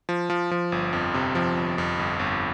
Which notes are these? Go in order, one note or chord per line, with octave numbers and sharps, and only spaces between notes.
F3
F3
F3
G1
F2
C3
F3
G1
F2
G1
G1